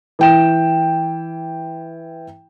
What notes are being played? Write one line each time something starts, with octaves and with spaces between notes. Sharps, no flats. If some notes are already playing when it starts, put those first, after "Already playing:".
E3 G5 E7